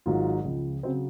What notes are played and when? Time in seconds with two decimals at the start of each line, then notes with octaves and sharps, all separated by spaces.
0.06 G#1 G#2 F#3 F4
0.44 C#2 C#3 F3
0.83 C#3 F#3 C4